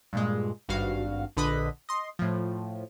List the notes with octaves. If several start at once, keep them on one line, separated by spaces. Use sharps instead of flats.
G2 A#2 G#3
G#1 G2 F#4 F5
A#1 D3 B4 D#5 B5
D#5 C6
A2 F3